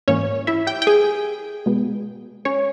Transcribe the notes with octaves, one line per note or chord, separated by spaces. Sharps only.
G#2 E3 A#3 C#4 C#5
E4 E5
G4 G5
G5
G#4 G#5
B2 G#3 B3
C#4 C#5